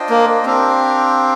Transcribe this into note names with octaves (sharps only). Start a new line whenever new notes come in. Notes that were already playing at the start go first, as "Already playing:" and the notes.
Already playing: D4 F4 C5 D#5 G5
A#3
C4 D4 G4 A#4 F5